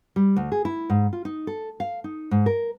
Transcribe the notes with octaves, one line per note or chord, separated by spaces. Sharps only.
G3
D2
G#4
E4
G#2
F4
D#4
A4
F5
D#4
G#2
A#4